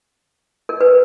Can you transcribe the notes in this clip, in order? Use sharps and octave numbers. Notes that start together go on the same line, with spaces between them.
A#4
B4